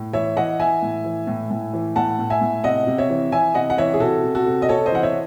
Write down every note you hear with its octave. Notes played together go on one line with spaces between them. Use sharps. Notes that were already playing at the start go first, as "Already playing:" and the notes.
Already playing: A2
E3 C#5 E5
E3 D#5 F#5
E3 E5 G#5
A2
E3
A2
A2
E3
A2 F#5 A5
A2
E5 G#5
A2
C3 D#5 F#5
C3
C#5 E5
E3
E3 E5 G#5
C3 D#5 F#5
F#5
E3 C#5 E5
G#4
C3 F#4 A4
C3
F#4 A4
C3
D#5
C3 A4 C#5
C5 D#5
E3 F#5
C#5 E5